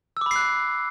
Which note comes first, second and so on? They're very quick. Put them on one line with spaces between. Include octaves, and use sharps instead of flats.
E6 D6 B5 C7 F#6